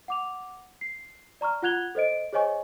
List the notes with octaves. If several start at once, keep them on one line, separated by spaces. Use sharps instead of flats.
F#5 D6 F7
C7
D5 A#5 C#6 F6
F4 F#5 F#6 G#6 F7 G7
A4 C5 D#5 D7
G#4 C5 C#5 D#5 G#5 C#6